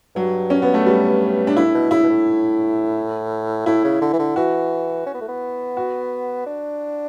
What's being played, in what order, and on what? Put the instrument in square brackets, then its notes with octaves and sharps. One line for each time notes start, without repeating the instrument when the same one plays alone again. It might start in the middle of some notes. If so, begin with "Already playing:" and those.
[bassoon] G2 [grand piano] F#3
[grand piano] C#4
B3
A3
G3
D4
[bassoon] A2 [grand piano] E4
[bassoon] B2
[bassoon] C#3 [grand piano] E4
[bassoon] B2
A2
[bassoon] A2 [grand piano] E4
[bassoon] C#3
D3
E3
D3
[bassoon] E3 [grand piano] F#4
[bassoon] C#4
B3
A3
B3
[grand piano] F#4
[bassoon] D4